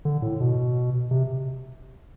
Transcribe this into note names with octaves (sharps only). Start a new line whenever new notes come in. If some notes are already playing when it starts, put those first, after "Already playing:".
D3
A2
B2
C3